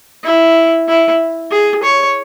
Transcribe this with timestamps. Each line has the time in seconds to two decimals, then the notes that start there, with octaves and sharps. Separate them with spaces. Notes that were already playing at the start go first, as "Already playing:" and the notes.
0.24 E4
0.88 E4
1.51 G#4
1.83 C#5